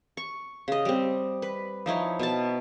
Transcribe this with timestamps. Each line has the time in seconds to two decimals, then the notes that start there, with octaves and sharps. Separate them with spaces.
0.17 C#6
0.68 C#3 D#5
0.85 G3 C4
1.42 B4
1.86 F3 D#4 E4 C#5
2.19 B2 A5